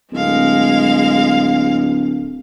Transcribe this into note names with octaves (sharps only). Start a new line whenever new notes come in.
D1 G#3 F5